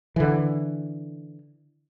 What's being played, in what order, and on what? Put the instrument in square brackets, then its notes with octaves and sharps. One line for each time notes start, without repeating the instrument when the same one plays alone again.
[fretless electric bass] D3 E3